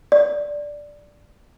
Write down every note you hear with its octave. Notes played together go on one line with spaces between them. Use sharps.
D5